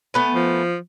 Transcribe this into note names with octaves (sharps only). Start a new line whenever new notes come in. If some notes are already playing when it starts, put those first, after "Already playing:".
A3 B3 G#5
F3